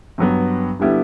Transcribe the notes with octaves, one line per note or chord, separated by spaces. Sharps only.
G2 F#3 B3
D3 G3 B3 E4 G4